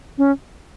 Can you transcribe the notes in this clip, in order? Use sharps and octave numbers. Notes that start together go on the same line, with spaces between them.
C#4